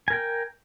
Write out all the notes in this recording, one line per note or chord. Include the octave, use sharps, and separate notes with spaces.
A#4 G5 G#5